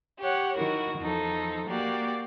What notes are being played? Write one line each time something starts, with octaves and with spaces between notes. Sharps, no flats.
G4 C#5 F#5
D#3 E4 F#4 A#4
E2 F3 D#4 A4
A#3 F#4 G4 D5